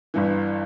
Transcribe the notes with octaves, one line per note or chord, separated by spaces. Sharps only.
G1 G2 E3